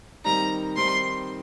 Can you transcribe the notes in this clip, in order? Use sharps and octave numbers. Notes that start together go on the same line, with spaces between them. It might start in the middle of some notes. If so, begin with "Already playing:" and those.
D#3 G3 C4 D#4 A#5
D#3 G3 C4 D#4 C6